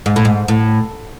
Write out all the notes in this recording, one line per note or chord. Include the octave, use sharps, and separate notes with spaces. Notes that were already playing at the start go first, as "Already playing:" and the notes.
G#2
A2
G#2
A2